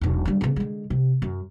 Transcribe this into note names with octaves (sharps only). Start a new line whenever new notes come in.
E1 B1
D3 G3
C#3 B3
D3 G#3
C3
F#2